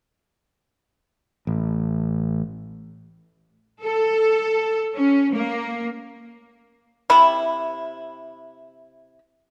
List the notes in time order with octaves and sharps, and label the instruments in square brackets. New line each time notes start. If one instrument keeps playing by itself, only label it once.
[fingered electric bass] A1
[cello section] A4
C#4
A#3
[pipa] C3 E4 B5